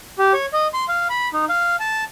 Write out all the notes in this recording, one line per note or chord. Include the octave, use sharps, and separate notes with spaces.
G4
C#5
D#5
C6
F5
B5
D#4
F5
A5